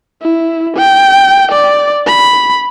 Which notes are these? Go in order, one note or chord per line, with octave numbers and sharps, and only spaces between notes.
E4
G5
D5
B5